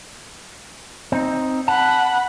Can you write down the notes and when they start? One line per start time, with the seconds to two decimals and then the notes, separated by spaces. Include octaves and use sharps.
1.12 C4 D#4
1.68 F#5 A5 B5